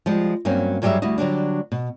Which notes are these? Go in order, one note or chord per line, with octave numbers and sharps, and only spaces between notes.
F3 G3 G#3
G2 F#3 A#3 C4 C#4
G2 F#3 G3 G4 G#4 E5
D2 G3 E4 F#4 D#5
D3 F#3 G3 D4
B2